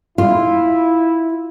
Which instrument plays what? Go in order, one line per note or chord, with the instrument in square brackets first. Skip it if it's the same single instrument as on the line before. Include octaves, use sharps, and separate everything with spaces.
[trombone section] E4 [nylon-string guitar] F4